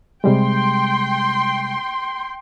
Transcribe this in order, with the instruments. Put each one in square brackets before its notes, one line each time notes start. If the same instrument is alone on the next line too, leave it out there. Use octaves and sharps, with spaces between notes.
[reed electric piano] C3 G3 G#3 [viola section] G5 C6